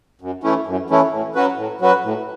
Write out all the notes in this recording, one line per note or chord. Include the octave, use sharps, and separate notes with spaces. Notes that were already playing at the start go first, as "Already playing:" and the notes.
F#2
E3 A3 C#4 E4
F#2
E3 A3 C#4 E4
A2
F#3 C#4 F#4 B4
A2
F#3 C#4 F#4 B4
A2